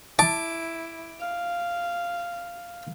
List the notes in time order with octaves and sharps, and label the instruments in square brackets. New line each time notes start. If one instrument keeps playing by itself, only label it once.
[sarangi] E4 [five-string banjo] A5 [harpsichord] D6
[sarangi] F5